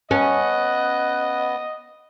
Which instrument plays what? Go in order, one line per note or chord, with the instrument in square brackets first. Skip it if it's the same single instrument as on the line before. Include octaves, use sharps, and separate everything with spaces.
[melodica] B3 [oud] C#4 [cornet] D#5 [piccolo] F#6